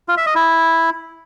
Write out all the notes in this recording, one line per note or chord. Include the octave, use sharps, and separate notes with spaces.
F4
E5
D#5
E4